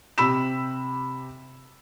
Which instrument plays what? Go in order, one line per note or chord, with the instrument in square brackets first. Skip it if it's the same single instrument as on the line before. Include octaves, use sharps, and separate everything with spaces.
[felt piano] C3 G4 B5 E6 B6 E7